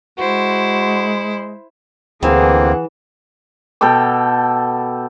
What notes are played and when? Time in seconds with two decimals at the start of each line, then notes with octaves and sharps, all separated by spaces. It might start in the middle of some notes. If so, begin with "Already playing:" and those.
0.19 G#3 E4 F#4 C5
2.23 D2 E3 A#3 C4 G#4 F#5
3.81 B2 A4 G5 D6